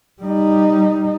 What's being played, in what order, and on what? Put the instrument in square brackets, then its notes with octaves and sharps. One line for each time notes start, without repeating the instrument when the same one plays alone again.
[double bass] G3 D#4